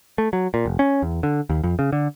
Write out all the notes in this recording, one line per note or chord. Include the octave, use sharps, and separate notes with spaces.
A3
F#3
A#2
F1
C#4
E2
D3
D#2
F2
C#3
D3